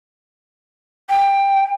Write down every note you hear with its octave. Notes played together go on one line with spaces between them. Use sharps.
G5